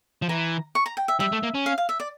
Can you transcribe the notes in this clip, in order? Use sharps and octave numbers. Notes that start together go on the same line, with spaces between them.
F3
E3 A#5
C#6
A#5
G5
E5
G3 E5
A3
A#3
C#4
F5
F5
E5
D5